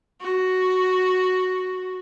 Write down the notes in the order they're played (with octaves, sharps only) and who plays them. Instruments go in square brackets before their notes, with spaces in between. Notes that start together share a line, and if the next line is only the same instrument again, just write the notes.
[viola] F#4